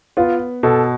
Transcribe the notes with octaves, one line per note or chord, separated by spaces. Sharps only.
B3 F4
B2 A4